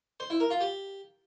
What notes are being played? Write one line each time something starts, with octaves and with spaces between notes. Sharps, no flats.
C5
E4
A#4
F4
G4